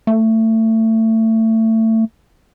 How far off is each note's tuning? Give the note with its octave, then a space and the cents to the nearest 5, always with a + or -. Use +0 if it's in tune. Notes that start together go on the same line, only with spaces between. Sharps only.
A3 +25